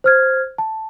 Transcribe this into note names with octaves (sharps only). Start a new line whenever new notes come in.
C5 F6 G#6
A5